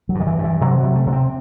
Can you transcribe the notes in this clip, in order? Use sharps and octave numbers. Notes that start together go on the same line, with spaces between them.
F#3
G2
D#3
E3
G2
E3
C3 F#3
F#3
C3
A3
C3
C4